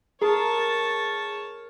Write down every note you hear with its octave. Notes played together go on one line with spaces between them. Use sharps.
G#4 A#4 C#5 A5